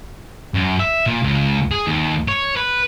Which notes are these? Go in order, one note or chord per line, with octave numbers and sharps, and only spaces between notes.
F#2
E5
A#2
C#2
G#4
D#2
C#5
B4